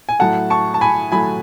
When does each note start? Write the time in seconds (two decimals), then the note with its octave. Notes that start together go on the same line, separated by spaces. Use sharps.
0.09 G#5
0.19 A2 F#3 A3 F#5 A5
0.50 A5 C#6
0.74 A5
0.81 G#5 B5
1.12 A2 F#3 A3 G#5 B5